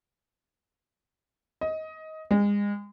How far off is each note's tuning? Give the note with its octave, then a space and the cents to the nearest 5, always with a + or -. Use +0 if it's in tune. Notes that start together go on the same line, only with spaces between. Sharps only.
D#5 +20
G#3 -30